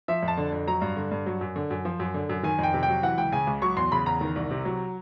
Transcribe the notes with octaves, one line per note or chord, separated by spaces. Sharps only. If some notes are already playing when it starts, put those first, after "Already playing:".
F3 E5
F2
A5
D3
F2
F#3 A#5
G2
D3
G2
F#3
F#2
D3
F#2
F3
F#2
D3
F#2
D#3 G#5
F2 G5
C3
G5
F#3
E3 F#5
C#2 G5
C#3 G#5
C#2
F#3 C#6
E2 C6
C#3 B5
E2 A#5
D#3
C2
C3
F#3